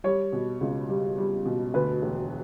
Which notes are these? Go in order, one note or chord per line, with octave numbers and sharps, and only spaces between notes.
G3 C#5
B2
C#2
G3
G3
B2
D2 B4
E1